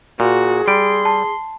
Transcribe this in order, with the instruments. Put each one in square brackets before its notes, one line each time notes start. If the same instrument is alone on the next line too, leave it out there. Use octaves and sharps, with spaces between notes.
[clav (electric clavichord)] A#2 [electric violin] F#4 [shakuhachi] G#4
[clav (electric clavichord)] G3 [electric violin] C6 [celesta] D7
[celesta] A5